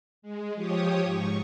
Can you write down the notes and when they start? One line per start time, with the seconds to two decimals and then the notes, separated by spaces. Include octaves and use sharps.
0.22 G#3
0.54 F3 G4 C#5 D#6
1.03 G#2 C#6